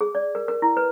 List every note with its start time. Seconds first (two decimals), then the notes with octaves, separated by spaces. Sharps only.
0.01 G#4
0.15 D5
0.35 A#4
0.48 A#4
0.62 E4
0.77 B4